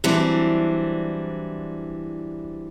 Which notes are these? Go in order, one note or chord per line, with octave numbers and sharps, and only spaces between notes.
E3 F#3 G3 C4 D4